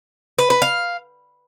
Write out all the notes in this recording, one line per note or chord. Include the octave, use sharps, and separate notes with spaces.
B4
B4
F5